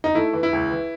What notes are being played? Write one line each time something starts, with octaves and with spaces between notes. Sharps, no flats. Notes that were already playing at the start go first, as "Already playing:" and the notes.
D#4
A3 E4
E3
E4
C#2
E3